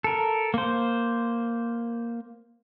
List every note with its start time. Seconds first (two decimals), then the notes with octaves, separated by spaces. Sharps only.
0.04 A4 A#4
0.54 A#3 C5